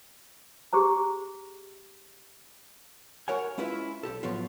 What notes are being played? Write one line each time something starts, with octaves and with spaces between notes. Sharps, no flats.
G4 G#4 C5 A#5
F#4 A#4 C#5 F#5 G#5
G#3 C#4 E4 F4 B4 E5
B1 G4 A4
A2 F3 F#3 B3 F4